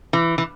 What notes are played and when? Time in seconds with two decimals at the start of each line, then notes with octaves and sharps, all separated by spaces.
0.13 E3
0.38 E3